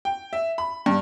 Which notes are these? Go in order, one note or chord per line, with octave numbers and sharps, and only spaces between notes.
G5
E5
B5
G2